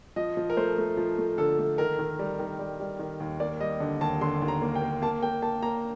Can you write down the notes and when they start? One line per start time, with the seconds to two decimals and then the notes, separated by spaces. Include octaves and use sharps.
0.16 F3 D#5
0.37 F3
0.50 A#4
0.57 A3 C5
0.78 A3
0.97 F3
1.18 A3
1.38 D3 A4
1.59 A3
1.78 D#3 A#4
1.99 D#3
2.19 G3
2.39 D#3
2.59 G3
2.80 G3
2.99 D#3
3.20 D#2
3.40 A#3 D5
3.60 G3 D#5
3.80 D3
4.01 D#2 A5
4.21 D3 C6
4.42 D#2
4.48 A#5
4.62 A#3
4.75 G5
4.81 A#3
5.02 A#3 A5
5.23 A#3 G5
5.42 A#3 A5
5.62 A#3 A#5